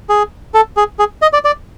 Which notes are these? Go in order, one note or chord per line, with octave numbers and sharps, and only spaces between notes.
G#4
A4
G#4
G#4
D#5
D5
D5